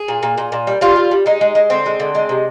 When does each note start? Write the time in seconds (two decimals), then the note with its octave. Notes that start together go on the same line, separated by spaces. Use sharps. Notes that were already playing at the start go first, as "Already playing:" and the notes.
Already playing: G#4
0.08 A#2
0.23 A#2
0.37 A#2
0.52 A#2
0.67 G3
0.81 G3 F4
0.96 G3
1.11 G3
1.26 G#3 D#4
1.41 G#3
1.55 G#3
1.70 D3 C4
1.86 G#3
2.00 D3
2.15 G#3
2.29 C3